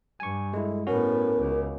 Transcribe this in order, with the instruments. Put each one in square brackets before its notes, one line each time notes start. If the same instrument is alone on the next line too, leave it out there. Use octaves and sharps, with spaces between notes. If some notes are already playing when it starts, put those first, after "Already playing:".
[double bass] G2 [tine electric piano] G#5 C#6
[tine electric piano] G#3 E4 [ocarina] A4
[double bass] A2 B3 [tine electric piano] C#4 F#4 [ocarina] A#4
[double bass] C#2